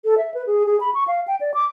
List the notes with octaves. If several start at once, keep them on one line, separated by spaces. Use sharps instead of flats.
A4
E5
B4
G#4
G#4
B5
C#6
F5
G5
D5
D6